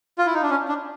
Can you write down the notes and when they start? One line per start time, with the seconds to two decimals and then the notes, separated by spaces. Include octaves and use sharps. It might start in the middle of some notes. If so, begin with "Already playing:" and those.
0.18 F4
0.26 E4
0.34 D#4
0.42 D4
0.50 C#4
0.68 D4